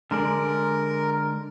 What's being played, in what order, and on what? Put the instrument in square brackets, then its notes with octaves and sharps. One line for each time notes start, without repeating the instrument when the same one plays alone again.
[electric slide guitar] D3 G#3 D5 [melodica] A#4